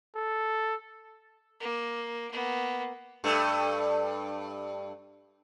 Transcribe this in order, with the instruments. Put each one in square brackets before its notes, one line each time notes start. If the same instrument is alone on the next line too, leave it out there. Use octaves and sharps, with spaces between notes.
[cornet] A4
[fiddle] A#3
A#3 B3
[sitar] G2 A3